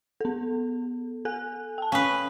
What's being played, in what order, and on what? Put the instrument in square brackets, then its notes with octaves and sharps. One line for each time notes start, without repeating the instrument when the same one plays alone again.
[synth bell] B3 A4
A4 G#5 F#6
G5 A5
[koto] C#4 B4 [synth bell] F5 D#6